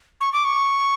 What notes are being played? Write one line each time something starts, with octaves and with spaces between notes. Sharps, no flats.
C#6
D6
C#6